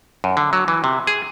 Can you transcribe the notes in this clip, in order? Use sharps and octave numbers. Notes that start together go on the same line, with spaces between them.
F#2
D3
F#3
E3
C3
G#4